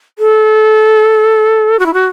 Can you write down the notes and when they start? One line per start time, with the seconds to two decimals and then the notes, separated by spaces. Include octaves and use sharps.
0.18 A4
1.79 F#4
1.86 E4
1.93 F#4